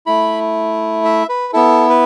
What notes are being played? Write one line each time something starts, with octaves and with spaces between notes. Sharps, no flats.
A3 E4 B5
E5
B4
B3 E4 A4
B4